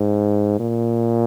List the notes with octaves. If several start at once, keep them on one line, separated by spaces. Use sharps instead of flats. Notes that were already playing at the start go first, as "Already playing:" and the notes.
Already playing: G#2
A#2